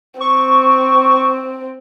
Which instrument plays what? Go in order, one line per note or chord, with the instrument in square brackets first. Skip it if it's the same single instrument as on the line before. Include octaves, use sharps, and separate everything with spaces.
[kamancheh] C4 [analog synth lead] C#6